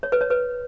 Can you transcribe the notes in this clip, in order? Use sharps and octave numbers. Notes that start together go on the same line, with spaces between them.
C#5
B4
C#5
B4